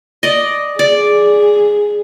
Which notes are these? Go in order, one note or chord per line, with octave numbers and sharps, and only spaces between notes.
D5 D#5
G#4 D5